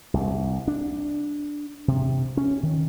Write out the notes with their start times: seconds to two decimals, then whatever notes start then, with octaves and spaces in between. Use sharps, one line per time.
0.14 C2
0.68 D4
1.88 C3
2.37 C#4
2.63 D#3